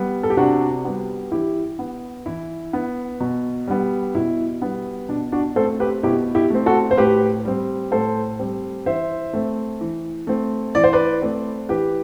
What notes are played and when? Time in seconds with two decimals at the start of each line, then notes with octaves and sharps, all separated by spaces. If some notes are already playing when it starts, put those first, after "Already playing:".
Already playing: G3 B3
0.23 A4
0.30 G4
0.37 C3 D4 F#4
0.85 G3 B3
1.32 E3 E4 G4
1.79 B3
2.26 E3 E4
2.73 B3
3.20 B2
3.67 G3 B3
4.15 B2 E4
4.62 G3 B3
5.09 B2 D4
5.32 D4 F#4
5.56 A3 A4 C5
5.59 C4
5.80 G4 B4
6.03 B2 E4 G4
6.35 E4 G4
6.50 A3 C4
6.66 F#4 A4
6.91 C5
6.97 A2 G4 B4
7.45 G3 C4
7.92 A2 A4 C5
8.39 G3 C4
8.86 E3 C5 E5
9.33 A3 C4
9.81 E3
10.27 A3 C4
10.75 E3 D5
10.84 C5
10.93 B4 D5
11.22 A3 C4
11.68 E3 G4 B4